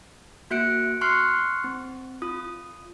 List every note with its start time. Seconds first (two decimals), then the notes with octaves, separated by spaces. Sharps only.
0.50 A#3 F#4 E5 F#6 C#7 D7
1.01 C6 C#6 F6 F#6 C7 C#7
1.64 C4
2.22 F4 D#6